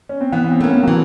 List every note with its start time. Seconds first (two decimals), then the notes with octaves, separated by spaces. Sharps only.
0.09 C#4
0.21 C4
0.32 E3 B3
0.44 B3
0.51 C4
0.61 A3 A#3 C#4
0.69 B3
0.83 F#3
0.88 E3 F3